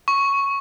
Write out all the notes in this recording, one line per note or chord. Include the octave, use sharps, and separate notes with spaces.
C#6